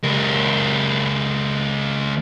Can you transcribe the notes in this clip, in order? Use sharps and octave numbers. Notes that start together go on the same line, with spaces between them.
C#2 A#4